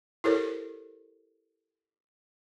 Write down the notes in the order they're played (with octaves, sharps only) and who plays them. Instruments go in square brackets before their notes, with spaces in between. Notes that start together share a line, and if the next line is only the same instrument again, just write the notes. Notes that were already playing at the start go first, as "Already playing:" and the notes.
[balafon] E4 G4 A4 A#4 C5 C#5